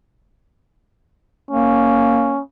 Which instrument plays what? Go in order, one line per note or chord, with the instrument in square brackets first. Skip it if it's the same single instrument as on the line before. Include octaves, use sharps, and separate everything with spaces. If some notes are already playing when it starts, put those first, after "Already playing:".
[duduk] A#3 [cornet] C#4